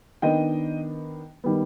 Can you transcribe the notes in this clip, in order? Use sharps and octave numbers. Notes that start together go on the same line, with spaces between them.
D#3 B3 D4 D#5 G5
D#3 G3 B3